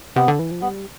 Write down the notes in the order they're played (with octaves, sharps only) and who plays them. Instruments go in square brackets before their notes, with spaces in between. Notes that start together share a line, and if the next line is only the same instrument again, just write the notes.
[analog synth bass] C3 [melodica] B3
[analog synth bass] D3
E3
F3
[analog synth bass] G3 [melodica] B3